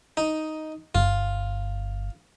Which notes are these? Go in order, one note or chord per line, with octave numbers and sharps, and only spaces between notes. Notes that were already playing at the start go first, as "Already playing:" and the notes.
D#4
G1 F4